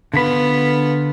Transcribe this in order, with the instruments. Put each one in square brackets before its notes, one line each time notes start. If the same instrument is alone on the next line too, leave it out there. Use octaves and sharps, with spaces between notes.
[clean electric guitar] D3 B5 [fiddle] B3 F4